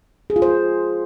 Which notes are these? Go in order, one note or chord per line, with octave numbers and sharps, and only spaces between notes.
G#4
F4
C5